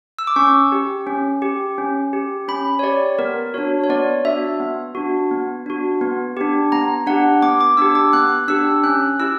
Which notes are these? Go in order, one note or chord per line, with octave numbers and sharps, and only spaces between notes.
E6
D6
C#4 C#6
G4
C#4
G4
C#4
G4
C#4 B5
C#5
G4 D5
B3 A#4
D4 F#4 C#5
C#5
B3 D5
D4 F#4 E5
B3
D4 F#4
B3
D4 F#4
B3
D4 G4
B3 A#5
D4 G4 F#5
B3 D6
D6
D4 G4 E6
D6
B3 F#6
D4 G4 E6
C#4 F#6
E4 G4 E6